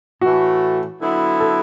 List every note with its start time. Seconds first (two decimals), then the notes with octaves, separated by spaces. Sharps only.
0.21 A2 E3 A3 F#4
1.01 D3 F#3 B3 E4
1.40 A4